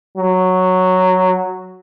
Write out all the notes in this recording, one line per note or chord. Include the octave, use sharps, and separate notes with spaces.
F#3